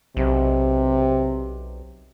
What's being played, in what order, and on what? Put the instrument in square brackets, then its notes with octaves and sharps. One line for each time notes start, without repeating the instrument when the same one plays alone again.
[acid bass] B1 [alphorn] C3